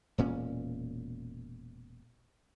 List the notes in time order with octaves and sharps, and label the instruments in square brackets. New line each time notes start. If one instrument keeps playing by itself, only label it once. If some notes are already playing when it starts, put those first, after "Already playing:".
[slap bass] E1 A#2 C#4